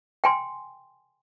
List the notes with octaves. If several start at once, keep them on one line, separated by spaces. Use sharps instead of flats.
G5 G#5 C6